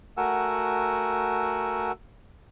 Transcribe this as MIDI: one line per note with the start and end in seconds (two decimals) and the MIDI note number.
0.17 1.92 57
0.17 1.92 66
0.17 1.92 70
0.17 1.92 78
0.17 1.92 80
0.17 1.92 88